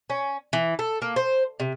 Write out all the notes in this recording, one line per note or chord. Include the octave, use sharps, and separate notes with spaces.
C#4
E3
A4
A#3
C5
C3